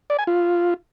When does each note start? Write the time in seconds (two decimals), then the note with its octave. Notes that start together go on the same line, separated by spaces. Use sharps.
0.10 D5
0.19 G#5
0.27 F4